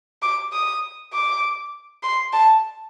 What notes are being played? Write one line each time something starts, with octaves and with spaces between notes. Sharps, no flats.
D6
D#6
D6
C6
A5